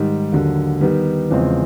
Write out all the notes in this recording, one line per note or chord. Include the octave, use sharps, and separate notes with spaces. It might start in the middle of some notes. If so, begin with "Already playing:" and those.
Already playing: G#2 D#3 G3
D#2 D3 F#3
D#3 G3 B3
E2 C#3 F3 G#3 C4